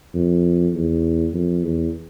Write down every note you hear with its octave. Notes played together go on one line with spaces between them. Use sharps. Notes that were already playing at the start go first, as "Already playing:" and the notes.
F2
E2
F2
E2